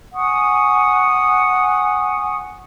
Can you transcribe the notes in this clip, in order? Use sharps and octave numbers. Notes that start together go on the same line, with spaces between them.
F#5 G#5 C#6 D#6